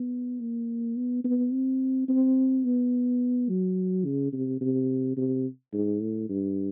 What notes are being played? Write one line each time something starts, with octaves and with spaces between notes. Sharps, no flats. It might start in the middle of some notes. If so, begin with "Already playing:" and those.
Already playing: B3
A#3
B3
B3
C4
C4
B3
F#3
C#3
C3
C3
C3
G#2
A2
G2